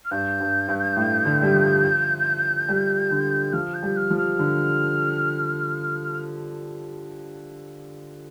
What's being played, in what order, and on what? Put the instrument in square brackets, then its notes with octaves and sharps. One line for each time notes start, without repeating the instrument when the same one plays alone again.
[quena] F6
[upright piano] G2 [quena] G6
[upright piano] G2
G2
A2
D3
G3
F3
G3
D3
[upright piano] F3 [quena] F6
[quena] G6
[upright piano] G3
[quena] F6
[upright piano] F3
[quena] F6
[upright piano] D3